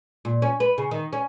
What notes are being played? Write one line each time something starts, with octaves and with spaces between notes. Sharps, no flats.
A#2
C#4
B4
C#3
D#3
C#4